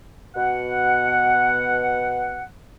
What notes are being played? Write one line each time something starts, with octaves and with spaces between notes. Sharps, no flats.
B2 F#5